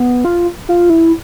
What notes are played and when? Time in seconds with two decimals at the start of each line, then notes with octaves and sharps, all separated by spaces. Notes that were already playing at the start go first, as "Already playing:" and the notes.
Already playing: B3
0.25 F4
0.69 F4
0.90 E4